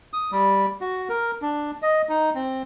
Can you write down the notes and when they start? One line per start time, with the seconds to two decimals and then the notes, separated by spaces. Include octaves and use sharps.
0.13 D#6
0.32 G3
0.81 F#4
1.09 A#4
1.42 D4
1.82 D#5
2.09 D#4
2.35 C4